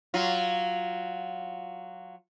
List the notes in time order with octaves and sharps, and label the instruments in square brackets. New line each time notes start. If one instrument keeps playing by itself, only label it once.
[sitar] F#3 F4